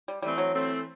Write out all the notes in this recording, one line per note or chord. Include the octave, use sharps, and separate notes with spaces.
G3
E3 G3 A3 C4
F#3
E3 A3 C4